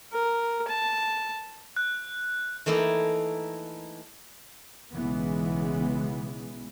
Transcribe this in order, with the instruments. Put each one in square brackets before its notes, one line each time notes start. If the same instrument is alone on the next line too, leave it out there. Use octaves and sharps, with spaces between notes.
[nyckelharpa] A#4
A5
[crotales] F#6
[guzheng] E3 A3 A#3 D#4 E4
[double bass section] B1 C#3 E3 G#3 B3